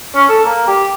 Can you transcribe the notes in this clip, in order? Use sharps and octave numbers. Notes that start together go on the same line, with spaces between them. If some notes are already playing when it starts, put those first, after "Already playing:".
C#4
A4
A#3
G4